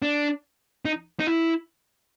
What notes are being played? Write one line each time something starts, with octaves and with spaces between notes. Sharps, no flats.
D4
D#4
D#4
E4